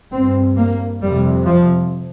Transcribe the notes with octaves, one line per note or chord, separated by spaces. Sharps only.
G2 C4
A#3
F2 C3 G3
F3